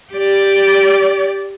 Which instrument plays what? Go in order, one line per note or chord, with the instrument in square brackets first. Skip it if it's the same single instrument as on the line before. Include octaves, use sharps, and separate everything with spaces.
[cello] G4 D5